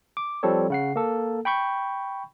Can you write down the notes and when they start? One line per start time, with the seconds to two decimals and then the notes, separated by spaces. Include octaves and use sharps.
0.17 D6
0.43 F3 G3 C4 A4 C#5
0.70 C#3 F#5 C7
0.96 A#3 A4
1.45 G5 B5 C#6 G6